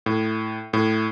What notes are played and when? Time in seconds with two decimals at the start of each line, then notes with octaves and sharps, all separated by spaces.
0.06 A2
0.73 A2